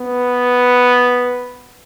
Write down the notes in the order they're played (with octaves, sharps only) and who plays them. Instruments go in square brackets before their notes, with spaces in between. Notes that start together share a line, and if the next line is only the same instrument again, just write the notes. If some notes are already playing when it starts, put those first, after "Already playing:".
Already playing: [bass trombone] B3